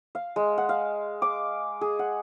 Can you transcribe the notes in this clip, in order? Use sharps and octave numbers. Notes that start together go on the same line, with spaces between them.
F5
G#3
F#5
F5
D6
G#4
F#5